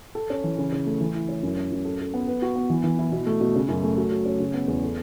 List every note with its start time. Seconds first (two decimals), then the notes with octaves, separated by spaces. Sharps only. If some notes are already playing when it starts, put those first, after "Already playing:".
0.15 A4
0.30 C#4
0.44 E3
0.58 C#3
0.72 C#3
0.86 A3
1.01 E3
1.15 E4
1.29 C#4
1.43 F#2
1.57 C#4
1.72 F#2
1.85 A4
2.00 A4
2.14 B3
2.27 B4
2.42 F#4
2.56 B3
2.70 E3
2.84 E3
2.99 E4
3.12 B2
3.27 A3
3.41 B2
3.56 C#3
3.69 F#2
3.83 A3
3.97 F#3
4.11 F#3
4.26 C#4
4.40 C#3
4.54 B3
4.68 E2
4.83 A4